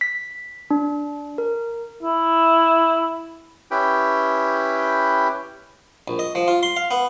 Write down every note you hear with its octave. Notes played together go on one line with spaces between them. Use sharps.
B6
D4
A#4
E4
C#4 E4 G4 B4 G5
A#1
D#5
F3
F4
C6
F5
B3